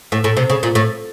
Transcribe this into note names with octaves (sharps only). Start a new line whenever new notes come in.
A2
A2
C3
C#3
A#2
A2